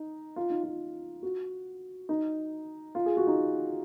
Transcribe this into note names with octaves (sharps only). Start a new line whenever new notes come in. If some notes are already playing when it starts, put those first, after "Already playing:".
Already playing: D#4
F4
D#4
F4
F#4
D#4
F4
G#4
F#4
D#4